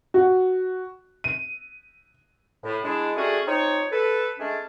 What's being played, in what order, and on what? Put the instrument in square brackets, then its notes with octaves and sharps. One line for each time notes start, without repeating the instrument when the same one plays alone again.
[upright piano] F#4
D#7
[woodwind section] A2
G#3 D4 E4
G3 A3 C#4 D4 F#4 G#4
C4 D#4 F4 C#5
A4 B4
G#3 A3 C#4 D4